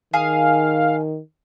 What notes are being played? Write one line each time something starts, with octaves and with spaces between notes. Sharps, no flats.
D#3 G#4 F5